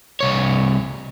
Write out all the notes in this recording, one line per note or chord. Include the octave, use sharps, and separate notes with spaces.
C2 C#5